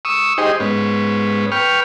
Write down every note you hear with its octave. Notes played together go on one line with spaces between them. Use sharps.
C#6 D#6 E6
D#4 G4 G#4 C5 D#5
G#2 B3 C#4
B4 G5 C#6 F6